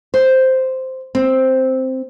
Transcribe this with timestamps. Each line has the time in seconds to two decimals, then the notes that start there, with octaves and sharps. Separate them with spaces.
0.14 C5
1.15 C4